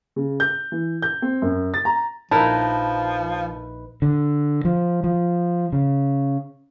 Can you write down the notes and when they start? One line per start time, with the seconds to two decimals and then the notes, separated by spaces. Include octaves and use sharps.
0.16 C#3
0.40 G6
0.72 E3
1.02 G6
1.22 C4
1.42 F#2
1.74 A6
1.85 A#5
2.31 A#1 F3 D#4 E4 A#4 B4 A5
4.02 D3
4.65 F3
5.04 F3
5.73 C#3